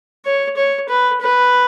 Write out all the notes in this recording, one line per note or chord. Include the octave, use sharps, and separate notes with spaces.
C#5
C#5
B4
B4